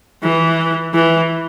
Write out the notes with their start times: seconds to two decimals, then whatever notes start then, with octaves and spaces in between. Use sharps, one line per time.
0.23 E3
0.94 E3